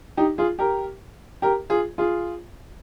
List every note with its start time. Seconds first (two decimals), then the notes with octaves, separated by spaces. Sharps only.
0.17 D#4 G4
0.38 F4 G#4
0.59 G4 A#4
1.42 G4 A#4
1.70 F4 G#4
1.98 F4 G#4